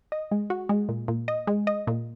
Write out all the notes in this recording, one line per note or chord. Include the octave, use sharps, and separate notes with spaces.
D#5
G#3
F#4
G#3
A#2
A#2
D#5
G#3
D#5
A#2